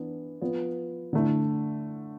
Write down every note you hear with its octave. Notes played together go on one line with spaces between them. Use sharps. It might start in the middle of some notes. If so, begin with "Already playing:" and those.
Already playing: E3 B3 D4
F3 B3 F4
D3 A3 E4